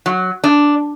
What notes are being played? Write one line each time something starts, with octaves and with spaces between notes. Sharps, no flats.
F#3
D4